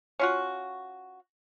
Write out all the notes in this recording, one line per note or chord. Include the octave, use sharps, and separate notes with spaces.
C#4 F4 F#4